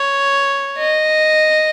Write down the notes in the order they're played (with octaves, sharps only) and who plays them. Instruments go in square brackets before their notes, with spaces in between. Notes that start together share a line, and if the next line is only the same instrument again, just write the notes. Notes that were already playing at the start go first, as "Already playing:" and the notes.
Already playing: [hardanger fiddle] C#5
D#5